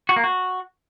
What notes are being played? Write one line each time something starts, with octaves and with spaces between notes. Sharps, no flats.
F#4
A#3
F#4